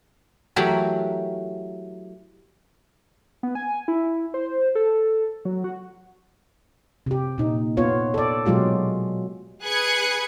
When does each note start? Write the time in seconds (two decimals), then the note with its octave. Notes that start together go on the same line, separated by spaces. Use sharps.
0.56 E3 F#3 A3 F#4 G4 A#4
3.43 B3
3.55 G#5
3.88 E4
4.34 C5
4.75 A4
5.45 F#3
5.64 F#4
7.06 C3 G4
7.38 A#2 D#4
7.77 B3 F4 C#5
8.14 A4 D5
8.46 B2 F#3 G#3 F4 G4
9.63 G#4 B4 B5 F#6 G#6 C#7